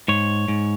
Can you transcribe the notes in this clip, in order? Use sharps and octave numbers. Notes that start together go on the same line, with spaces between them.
G#2 C#5
G#2